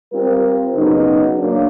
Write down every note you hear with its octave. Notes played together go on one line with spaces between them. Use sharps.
G3 C4 F4 A#4
C#3 F#3 B3 D#4
F#3 A#3 D4